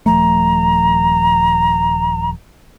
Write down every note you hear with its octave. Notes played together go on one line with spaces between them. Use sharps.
D#1 F3 A3 A#5